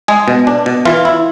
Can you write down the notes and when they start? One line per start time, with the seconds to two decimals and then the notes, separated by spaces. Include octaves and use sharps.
0.08 G#3 G#4
0.28 B2
0.47 D4
0.66 B2
0.85 E3 F4
1.05 E4